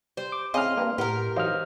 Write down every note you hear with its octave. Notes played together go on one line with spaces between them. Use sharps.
G3 C5
D6
A2 C#3 C4 D#5 C6 F6
G2 A#3 B4 G5
A2 G4 A#4 B4 F#5
E3 F#3 D#4 C5 D#5 F5 F6